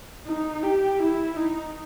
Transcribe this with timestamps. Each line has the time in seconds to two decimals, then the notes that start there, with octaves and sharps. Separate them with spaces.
0.27 D#4
0.63 G4
1.00 E4
1.36 D#4